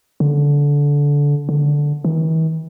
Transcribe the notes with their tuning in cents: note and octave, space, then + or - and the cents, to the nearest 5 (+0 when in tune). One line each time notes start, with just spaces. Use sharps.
D3 -20
D3 -5
E3 -45